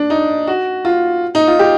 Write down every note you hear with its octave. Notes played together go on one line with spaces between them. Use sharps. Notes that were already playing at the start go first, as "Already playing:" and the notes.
Already playing: D4
D#4
F#4
F4
D#4
F4
G4